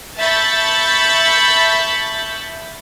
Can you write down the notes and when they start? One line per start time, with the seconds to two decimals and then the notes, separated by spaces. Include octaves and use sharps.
0.19 E5 A5 B5 C#6 G6 A6